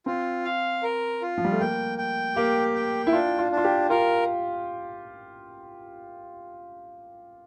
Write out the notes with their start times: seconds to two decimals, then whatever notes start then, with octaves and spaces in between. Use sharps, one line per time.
0.06 C4 F4
0.45 F5
0.83 A#4
1.22 F4
1.38 F3
1.44 G3
1.52 A3
1.60 A#3 G5
1.98 G5
2.36 A#3 G4
2.75 G5
3.07 E4
3.13 D4 F4
3.38 F4
3.52 D4
3.57 F4
3.65 G4
3.90 F4 A#4